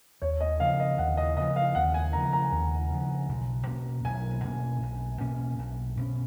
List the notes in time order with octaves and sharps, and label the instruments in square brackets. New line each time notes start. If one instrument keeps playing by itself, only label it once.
[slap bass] D#2 [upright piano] C#5
[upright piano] D#5
[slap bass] C#3 F3 [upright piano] F5
[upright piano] D#5
[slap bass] D#2 [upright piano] F#5
[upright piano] D#5
[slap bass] C#3 F3 [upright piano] D#5
[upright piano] F5
[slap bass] D#2 [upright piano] F#5
[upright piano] G#5
[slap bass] C#3 F3 [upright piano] A#5
[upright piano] A#5
[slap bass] D#2
C#3 F3
B1
B2 A#3 C#4
[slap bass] B1 [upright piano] G#5
[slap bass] B2 A#3 C#4
B1
B2 A#3 C#4
B1
B2 A#3 C#4